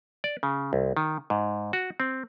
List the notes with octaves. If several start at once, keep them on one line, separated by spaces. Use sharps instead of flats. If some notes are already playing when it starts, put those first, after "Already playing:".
D5
C#3
C2
D#3
G#2
F#4
C4